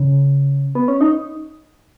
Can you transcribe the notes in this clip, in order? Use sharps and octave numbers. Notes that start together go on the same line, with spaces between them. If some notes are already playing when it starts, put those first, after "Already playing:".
Already playing: C#3
B3
C#4
D#4